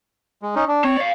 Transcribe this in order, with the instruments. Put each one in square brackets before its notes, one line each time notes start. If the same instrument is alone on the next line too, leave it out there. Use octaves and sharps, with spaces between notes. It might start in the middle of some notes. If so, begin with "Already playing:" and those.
[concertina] G#3
C#4 D#4
D4
[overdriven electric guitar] C4 [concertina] C#5
[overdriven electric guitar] D5 F5